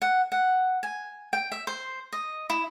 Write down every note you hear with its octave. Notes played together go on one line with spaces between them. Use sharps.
F#5
F#5
G#5
G5
E5
C5
D#5
E4